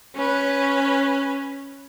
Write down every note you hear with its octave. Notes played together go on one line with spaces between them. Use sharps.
C#4 B4